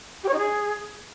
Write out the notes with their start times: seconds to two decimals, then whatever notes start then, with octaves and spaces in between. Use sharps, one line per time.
0.23 G4
0.28 C#5
0.33 D#4
0.38 G#4